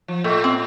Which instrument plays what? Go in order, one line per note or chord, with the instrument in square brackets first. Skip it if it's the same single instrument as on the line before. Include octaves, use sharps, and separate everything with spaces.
[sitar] F3
[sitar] A2 [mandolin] A3
[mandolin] C4